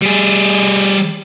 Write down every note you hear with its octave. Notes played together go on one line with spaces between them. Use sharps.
G3 G#4